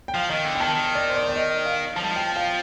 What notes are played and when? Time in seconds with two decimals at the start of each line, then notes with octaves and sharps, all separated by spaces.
0.08 G5
0.14 F3 F5
0.30 D#3 D#5
0.45 D3 G5
0.55 G5
0.60 D#3 A5
0.75 D#3
0.95 D5
1.10 C5
1.16 D5
1.29 D5
1.36 D#5
1.65 F5
1.96 F3 A5
2.04 G3
2.11 F3
2.16 G5
2.36 F5